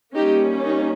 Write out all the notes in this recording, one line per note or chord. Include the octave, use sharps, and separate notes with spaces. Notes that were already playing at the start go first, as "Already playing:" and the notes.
G3 A#3 C#4 D#4 G4
D#4